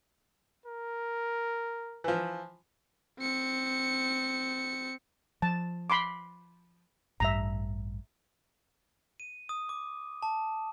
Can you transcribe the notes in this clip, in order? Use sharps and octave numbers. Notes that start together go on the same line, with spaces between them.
A#4
E3 F3
C4 C#7
F3 A5
B5 C6 D6
A1 G2 E5 A#5
D#7
D#6
D6
A5